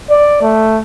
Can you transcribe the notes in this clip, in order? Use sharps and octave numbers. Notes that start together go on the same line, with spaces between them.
D5
A3